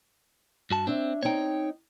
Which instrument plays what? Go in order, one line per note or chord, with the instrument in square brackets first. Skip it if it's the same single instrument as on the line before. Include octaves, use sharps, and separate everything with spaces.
[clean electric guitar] G2 F#4 A5
[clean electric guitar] C4 [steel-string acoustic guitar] D4 C#5 E5
[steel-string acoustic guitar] C4 D#4 [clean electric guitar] C#5 G5